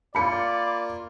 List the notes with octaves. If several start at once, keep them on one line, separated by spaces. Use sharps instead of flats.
A#3 F4 D5 B5 C#7